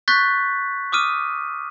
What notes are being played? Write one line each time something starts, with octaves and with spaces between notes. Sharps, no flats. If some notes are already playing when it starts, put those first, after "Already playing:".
C#6 F#6 G6 A6 B6
D6 D#6 F6 D#7